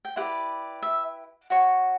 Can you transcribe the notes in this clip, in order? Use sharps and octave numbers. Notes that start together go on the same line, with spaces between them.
G5
E4 G4 B4 D5 F#5
E5
F#4 C#5